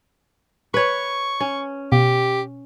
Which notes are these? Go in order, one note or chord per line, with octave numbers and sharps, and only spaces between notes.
B4 C#5 C#6
C#4
B2 G4